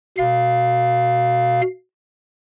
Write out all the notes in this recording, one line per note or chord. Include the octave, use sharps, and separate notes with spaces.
B2 F5